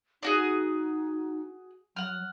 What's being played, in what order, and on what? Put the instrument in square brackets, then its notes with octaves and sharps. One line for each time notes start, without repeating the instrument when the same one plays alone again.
[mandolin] D4 F#4 G#4 [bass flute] D#4
[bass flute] F#3 [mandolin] F#5 F6